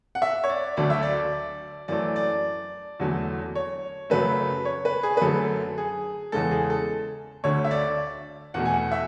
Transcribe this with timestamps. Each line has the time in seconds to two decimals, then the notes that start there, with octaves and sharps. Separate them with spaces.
0.15 F#5
0.22 E5
0.44 C#5
0.49 D5
0.77 D2 D3 F#3 A3 D5
0.90 E5
1.02 D5
1.88 F#2 E3 A3 D5
2.16 D5
3.00 E2 D3 F#3 A3
3.55 C#5
4.10 F#2 C#3 F#3 A3 B4
4.65 C#5
4.85 B4
5.03 G#4
5.17 B4
5.21 F#2 D3 F#3 A3 A4
5.78 G#4
6.32 E2 C#3 E3 G#3 A4
6.51 G#4
6.70 A4
7.44 D2 D3 A3 C#5
7.65 E5
7.71 D5
8.54 E2 B2 A3 F#5
8.66 G#5
8.74 F#5
8.92 E5